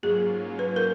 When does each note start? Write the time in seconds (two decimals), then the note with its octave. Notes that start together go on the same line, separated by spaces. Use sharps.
0.03 G#2 F#3 A#3 C#4 F4 G#4
0.59 B4
0.76 A#4